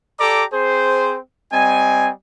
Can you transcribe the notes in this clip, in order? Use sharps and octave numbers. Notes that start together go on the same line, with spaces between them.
G4 A4 D5 A#5 D6
C4 G#4 C5
G3 C4 D#5 G#5